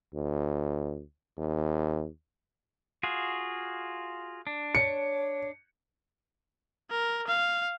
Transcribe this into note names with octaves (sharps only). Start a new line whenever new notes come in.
D2
D#2
F4 F#4 G#4
D4
C#5 C#7
A#4
F5